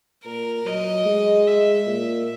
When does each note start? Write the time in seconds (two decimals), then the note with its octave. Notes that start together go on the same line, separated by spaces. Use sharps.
0.24 A#2 A#4
0.65 F#3 D#5
1.05 G#3
1.47 E5
1.87 A#2